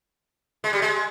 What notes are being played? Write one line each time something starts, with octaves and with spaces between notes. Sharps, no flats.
G#3
G3
G#3